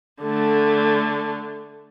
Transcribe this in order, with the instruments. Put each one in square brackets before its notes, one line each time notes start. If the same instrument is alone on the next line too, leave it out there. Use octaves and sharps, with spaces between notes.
[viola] D3 A3